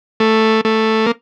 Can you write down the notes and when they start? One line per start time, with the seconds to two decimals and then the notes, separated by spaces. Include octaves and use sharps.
0.20 A3
0.65 A3
1.06 A#3